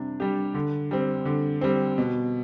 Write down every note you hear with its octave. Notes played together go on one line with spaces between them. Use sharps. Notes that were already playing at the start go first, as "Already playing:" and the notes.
Already playing: C3 G3 D4
G3 D4 G4
D3
G3 C4
D3
G3 C4
B2